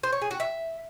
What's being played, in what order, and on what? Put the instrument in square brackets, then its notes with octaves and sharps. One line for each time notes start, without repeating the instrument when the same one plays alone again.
[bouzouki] C5
C#5
G#4
F#4
E5